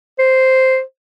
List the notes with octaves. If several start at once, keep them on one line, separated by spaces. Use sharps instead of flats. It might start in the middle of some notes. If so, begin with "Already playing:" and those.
C5